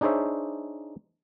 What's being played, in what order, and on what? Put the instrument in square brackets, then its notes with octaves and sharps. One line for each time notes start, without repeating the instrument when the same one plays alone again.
[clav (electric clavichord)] D4 D#4 G#4 C5 C#5 E5